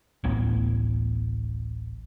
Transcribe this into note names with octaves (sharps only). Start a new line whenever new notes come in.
D1 A1 B3